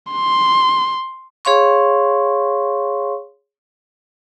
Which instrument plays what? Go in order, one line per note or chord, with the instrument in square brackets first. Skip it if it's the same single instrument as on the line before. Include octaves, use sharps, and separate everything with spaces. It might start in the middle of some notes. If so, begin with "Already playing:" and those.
[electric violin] C6
[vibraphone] G#4 C#5 F5 C6 C#6